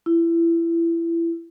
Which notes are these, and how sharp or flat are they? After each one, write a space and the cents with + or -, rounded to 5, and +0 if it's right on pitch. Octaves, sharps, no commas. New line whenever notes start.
E4 +25